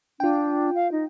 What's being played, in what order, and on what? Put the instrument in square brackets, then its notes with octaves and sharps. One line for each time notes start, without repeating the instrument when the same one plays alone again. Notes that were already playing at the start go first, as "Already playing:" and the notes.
[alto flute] D4 [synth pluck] F4 G5
[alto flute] F5
D#4